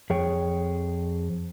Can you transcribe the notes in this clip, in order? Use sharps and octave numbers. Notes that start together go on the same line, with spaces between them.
F2 G#4 C#5 G5